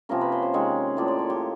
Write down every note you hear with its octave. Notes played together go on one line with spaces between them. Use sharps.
C3 F3 A#3 C#4 A#4
B4
C5
C5
C3 D#3 G#3 C#4 C#5
A2 F3 A#3 D5
D5
C#5
G4